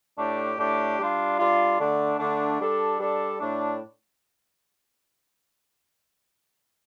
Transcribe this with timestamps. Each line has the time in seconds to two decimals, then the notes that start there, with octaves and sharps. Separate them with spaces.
0.18 A2 A3 D4 G4
0.58 A2 A3 D4 G4
0.98 G3 D4 F4
1.39 G3 D4 F4
1.79 D3 A3 D4
2.19 D3 A3 D4
2.59 G3 D4 A4
2.99 G3 D4 A4
3.40 A2 A3 D4